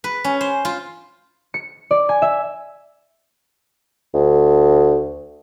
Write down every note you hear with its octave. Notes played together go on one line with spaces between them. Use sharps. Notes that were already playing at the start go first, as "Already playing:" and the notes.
B4
C#4
C5
F4
C#7
D5
G#5
E5
D2